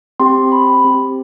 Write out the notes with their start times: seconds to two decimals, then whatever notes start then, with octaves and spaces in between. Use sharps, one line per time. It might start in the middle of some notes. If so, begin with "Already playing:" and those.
0.20 C4 G4 C6
0.52 B5
0.84 C4 G4